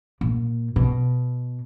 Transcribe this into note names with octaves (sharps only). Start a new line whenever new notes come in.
A#2
B2